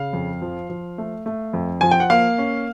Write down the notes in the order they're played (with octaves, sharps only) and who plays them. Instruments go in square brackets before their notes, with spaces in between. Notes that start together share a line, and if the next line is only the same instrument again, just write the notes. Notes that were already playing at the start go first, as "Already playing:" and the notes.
Already playing: [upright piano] C#3 F5
F2
F3
F3
A3
A3
F2
F3 G#5
G5
F#5
A#3 F5
C#4